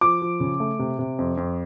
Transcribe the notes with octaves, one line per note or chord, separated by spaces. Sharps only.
F3 D6
F3
C#3
A3
C3
C3
F2
F2